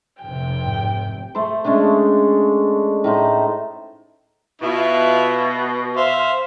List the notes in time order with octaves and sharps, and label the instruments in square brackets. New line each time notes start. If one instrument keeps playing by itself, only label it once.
[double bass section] F1 C3 [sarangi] G5
[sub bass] G#2
[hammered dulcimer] A3 C5
G#3 A3 C#4 D4
A2 D#4 C5
[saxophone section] B2 [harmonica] E4 F4 E5
[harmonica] C5 E5 F5